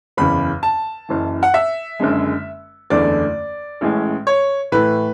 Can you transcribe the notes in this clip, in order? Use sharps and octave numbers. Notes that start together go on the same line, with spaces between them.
F#1 E2 C#3 B5
A5
F#1 F#2 E3
F#5
E5
F#1 F#2 D3 G#3
F#1 E2 D3 A3 E4 D5
A1 A2 G#3 C#4
C#5
A2 E3 A3 B4